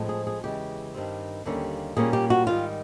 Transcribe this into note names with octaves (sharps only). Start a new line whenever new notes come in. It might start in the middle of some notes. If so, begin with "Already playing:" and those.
Already playing: A2 F3 G#3 C4
G#4
G#4
E2 C#3 E3 G#3 G4
G2 D#3 G3 C4
D#2 D3 G3 A#3 C#4
A#2 G3 A#3 C#4 G#4
G4
F#4
G#2 D#3 G3 F4